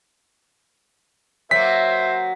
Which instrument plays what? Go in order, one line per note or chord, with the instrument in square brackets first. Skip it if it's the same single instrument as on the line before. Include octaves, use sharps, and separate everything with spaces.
[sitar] F#3 A#3 [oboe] C5 [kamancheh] E5 [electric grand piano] B6